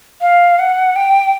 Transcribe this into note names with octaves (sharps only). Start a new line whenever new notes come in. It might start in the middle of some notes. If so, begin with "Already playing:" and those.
F5
F#5
G5